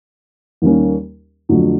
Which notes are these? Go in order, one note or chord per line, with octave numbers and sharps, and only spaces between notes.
D#2 D#3 G3 A#3 C#4
F2 D3 F#3 A3